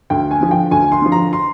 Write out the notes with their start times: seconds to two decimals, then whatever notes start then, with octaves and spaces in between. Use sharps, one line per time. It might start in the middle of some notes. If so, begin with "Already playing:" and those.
0.10 D2 G5
0.31 G#5
0.41 D3 F3
0.51 G5
0.71 D2 G#5
0.92 C6
1.02 D3 F3
1.12 A#5
1.33 C6